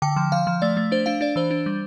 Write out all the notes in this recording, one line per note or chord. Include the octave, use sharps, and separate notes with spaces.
D3 G5
F3
F3 F5
F3
A3 D5
A3
D4 C5
D4 F5
D4 D5
E3 C5
D4
G3